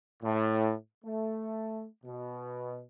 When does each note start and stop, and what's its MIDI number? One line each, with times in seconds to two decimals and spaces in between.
0.23 0.73 45
1.05 1.85 57
2.04 2.82 47